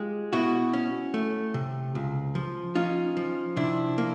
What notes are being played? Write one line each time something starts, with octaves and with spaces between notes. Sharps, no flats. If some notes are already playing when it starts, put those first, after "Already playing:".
Already playing: G#3 F4 G4
B2 E4 F#4
C#4
A3
C3
C#2
F3
C#4 D#4 F4
F3
C3 D4 E4
A#3